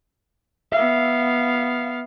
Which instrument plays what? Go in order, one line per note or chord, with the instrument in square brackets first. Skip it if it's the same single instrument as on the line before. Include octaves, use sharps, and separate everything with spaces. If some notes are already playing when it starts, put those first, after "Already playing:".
[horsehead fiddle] B3 F5 [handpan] E5